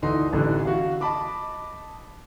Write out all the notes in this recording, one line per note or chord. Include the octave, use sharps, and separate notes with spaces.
D2 E3 D#4 A4 C6
A1 D3 E3
F#4 F5
D#5 A5 B5 D6